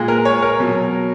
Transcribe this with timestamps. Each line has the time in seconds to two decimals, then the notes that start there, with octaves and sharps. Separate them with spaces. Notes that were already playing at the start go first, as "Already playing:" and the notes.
Already playing: A#2 G#3
0.08 A#4
0.25 C#5
0.42 A#4
0.60 B2 F#3